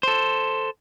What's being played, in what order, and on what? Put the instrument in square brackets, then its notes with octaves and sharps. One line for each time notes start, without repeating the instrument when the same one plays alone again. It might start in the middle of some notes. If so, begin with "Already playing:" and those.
[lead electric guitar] A4 C5